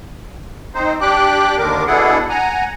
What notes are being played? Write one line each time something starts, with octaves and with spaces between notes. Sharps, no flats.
C4 D#4 C5
D4 G4 G5 D6 F#6
D#2 D3 D#3 D4 A#4 D6
B2 D4 E4 G#4 A4 F#5
F#5 G#5 A#5